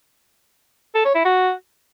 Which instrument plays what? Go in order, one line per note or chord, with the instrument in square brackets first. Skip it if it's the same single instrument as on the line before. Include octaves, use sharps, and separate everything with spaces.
[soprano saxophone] A4
C#5
E4
F#4